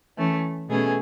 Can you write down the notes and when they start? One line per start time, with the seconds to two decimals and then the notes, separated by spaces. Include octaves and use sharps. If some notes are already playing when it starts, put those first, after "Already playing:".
0.17 E3 A3 C#4
0.69 B2 A3 C#4 G#4